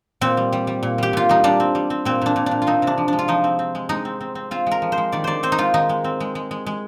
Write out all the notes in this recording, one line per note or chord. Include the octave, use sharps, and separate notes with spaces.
A#2 C4
G3
G3
G3
A#2
G3 G4
A#2 F4
G3 D#4
G3 D4
C4
G3
C4
A#2 C4
A#2 D4
A#2
D4
A#2
F4
C4 D#4
C3 D4
F3
G#3 D4
F4
F3 D#4
C4
C4
G#3
G#3 D#4
C4
C4
C4
C4 F4
G#3 A#4
F3
C5
G#3
D#3 D5
D#3 C5 D5
C4 C5
D#4
G#3 F4
D#3 D#4
G#3
C4
G#3
G#3
G#3
G#3